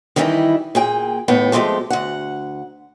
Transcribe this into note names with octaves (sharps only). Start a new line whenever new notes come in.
D#3 E3 G3 D#4 E4
A#2 G#4 G5
D#2 A2 B3 G5
F3 G#3 A3 C4 G4
D2 F#5